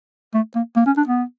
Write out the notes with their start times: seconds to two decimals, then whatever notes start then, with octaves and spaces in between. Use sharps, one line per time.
0.34 A3
0.56 A#3
0.76 A#3
0.86 C#4
0.97 D4
1.07 B3